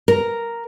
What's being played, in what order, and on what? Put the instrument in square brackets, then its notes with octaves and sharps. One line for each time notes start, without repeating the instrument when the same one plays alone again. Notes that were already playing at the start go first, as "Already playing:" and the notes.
[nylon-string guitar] A#4